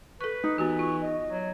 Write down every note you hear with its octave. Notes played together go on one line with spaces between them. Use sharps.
A4 B4 C#6
D#4
E3 B3 F#4 G4
F4 C#6
D#5
F#3